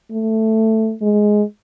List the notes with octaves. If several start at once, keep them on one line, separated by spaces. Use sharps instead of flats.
A3
G#3